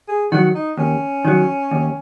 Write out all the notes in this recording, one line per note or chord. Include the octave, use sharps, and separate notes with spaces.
G#4
D#3 F#3 F#4
D#4
D#2 C#4
D#3 F#3
D#2